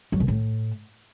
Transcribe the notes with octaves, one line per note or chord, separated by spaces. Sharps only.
F#3
B2
A2